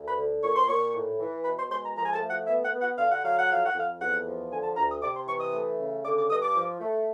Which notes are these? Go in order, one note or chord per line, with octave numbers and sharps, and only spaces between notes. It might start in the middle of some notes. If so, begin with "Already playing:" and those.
Already playing: D2
B5
D3
A#2 C#6
C6
A#2 C#6
A2
E3
B2 B5
C6
G#3 C6
A#5
F3 A#5
G#5
A5
A3
F#5
B3 E5
F#5
B3
F#5
D3 F5
F#5
F#3 F5
F#5
F2 F5
F#5
F2 F5
E2 F#5
F3
D3 G#5
A5
D2 A#5
D#6
C3 D6
C6
E3 C#6
D#6
A3
C#3
D3 D6
D6
G2 D#6
D6
F3
A3